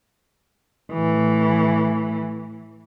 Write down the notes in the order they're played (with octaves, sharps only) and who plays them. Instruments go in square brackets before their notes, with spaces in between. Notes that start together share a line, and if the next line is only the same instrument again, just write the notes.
[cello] A2 E3